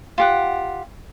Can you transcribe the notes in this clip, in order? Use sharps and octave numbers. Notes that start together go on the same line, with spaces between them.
F4 G4 F#5